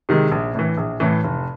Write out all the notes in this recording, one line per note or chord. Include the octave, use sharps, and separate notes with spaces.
C3 D#3 G#3
A#1
A2 E3
A#1
A2 E3
F1